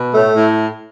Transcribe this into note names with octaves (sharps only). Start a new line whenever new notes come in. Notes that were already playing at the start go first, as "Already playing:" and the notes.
Already playing: B2
A2 A3
A2